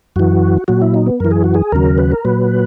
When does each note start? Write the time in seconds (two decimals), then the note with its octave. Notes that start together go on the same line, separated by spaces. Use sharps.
0.16 F#2 E3 F#4
0.68 A#2 F#3 F#4
0.82 E4
0.94 D#4
1.06 B3
1.20 F#2 E3 A#4
1.31 G#4
1.44 F#4
1.54 G#4
1.72 D#2 C#3 F#3 A#4
1.98 B4
2.12 A#4
2.25 A#2 F#3 B4